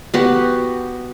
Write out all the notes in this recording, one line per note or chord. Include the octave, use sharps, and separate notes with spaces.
B3 F#4 G4